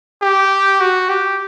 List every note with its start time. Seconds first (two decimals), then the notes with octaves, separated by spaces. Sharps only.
0.22 G4
0.80 F#4
1.09 G4